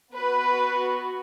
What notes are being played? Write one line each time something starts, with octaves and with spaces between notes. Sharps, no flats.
B3 F#4 B4